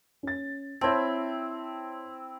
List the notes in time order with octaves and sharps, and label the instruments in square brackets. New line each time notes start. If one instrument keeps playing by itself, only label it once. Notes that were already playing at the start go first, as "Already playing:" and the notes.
[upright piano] C#4 A6
[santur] C4 E4 [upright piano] C#5 A5